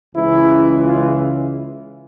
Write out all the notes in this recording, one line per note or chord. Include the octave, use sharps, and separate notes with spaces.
C#2 C#3 E3 G#3 E4
F4